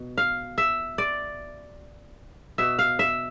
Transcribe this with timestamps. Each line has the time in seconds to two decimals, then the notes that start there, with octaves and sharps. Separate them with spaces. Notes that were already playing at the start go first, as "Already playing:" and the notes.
Already playing: B2
0.18 F5
0.58 E5
0.98 D5
2.58 B2 E5
2.79 F5
2.99 E5